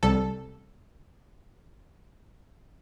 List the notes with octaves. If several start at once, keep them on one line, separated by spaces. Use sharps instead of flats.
C2 C3 G3 A4